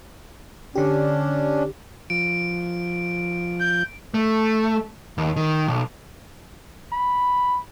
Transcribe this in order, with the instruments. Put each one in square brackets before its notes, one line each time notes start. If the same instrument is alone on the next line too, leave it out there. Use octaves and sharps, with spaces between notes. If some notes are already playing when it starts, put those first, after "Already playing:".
[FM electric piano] D3 G4 [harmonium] C#4 D4
[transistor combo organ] F3 [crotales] D7
[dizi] G6
[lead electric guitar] A3
D#2
D#3
B1
[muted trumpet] B5